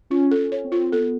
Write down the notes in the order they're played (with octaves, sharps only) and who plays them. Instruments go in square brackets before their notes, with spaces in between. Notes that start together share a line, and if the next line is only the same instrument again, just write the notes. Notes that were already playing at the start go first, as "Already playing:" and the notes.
[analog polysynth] C#4 [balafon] F4
[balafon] A4
[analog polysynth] C#4
[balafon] C#5
[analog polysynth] C4
[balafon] F4
[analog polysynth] B3 [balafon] A4